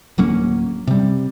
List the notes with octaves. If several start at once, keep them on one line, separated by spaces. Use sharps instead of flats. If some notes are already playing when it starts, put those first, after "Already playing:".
D1 F#3 A#3 C#4
C3 G3